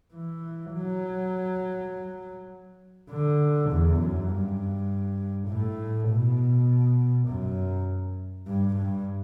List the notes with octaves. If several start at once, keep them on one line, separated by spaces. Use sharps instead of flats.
E3
F#3
D3
E2
F#2
G2
A2
B2
F#2
G2
G2